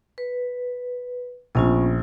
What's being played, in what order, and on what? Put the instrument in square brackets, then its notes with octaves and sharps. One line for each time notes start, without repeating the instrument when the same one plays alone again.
[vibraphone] B4
[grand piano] A#1 [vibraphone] B3 C#4 F4